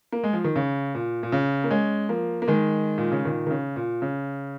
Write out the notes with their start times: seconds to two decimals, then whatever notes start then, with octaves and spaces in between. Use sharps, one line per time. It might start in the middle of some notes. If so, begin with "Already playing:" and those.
0.12 A#3
0.24 G#3
0.33 F3
0.44 D#3
0.56 C#3
0.95 A#2
1.23 A#2
1.32 C#3
1.64 A#3
1.70 G#3 C#4
2.09 F3 A#3
2.42 A#3
2.48 D#3 G#3
2.98 A#2
3.12 C#3
3.25 A#2 D#3
3.47 D#3
3.51 C#3
3.76 A#2
4.02 C#3